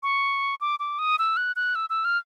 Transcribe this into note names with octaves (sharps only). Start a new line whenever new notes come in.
C#6
D6
D6
D#6
E6
F#6
F#6
E6
E6
F6